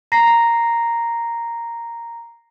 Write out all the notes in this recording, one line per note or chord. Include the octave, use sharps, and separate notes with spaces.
A#5 A#6 C7